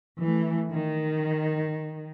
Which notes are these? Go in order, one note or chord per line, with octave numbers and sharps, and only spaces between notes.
E3 A3
D#3